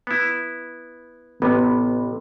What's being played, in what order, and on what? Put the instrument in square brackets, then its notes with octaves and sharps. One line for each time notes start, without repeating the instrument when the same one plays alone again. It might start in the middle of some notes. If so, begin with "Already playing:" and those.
[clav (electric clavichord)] B3 E4
[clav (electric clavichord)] A1 C3 [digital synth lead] B3